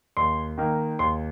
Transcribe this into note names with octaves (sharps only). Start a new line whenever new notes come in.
D#2 C6
D#3 A#3 D#4
D#2 C6